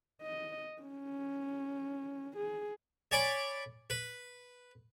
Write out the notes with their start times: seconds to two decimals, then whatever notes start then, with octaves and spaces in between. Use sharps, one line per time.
0.22 D#5
0.82 C#4
2.37 G#4
3.11 C#5 D5 G#5 B5 D6
3.90 B4